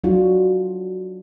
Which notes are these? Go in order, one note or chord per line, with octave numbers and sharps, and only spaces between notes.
F#3 D4 F4 F#4